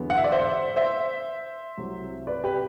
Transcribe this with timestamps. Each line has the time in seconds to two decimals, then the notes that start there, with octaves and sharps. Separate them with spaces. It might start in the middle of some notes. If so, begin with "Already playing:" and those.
Already playing: E2 D3 F#3 B3
0.10 F#5
0.18 E5
0.24 D5
0.32 C5 E5
0.76 C5 E5
1.77 C2 C3 F#3
2.27 B4 D5
2.44 G4 B4